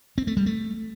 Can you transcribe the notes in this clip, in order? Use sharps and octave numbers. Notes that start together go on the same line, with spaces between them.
C4
A3
G3
A3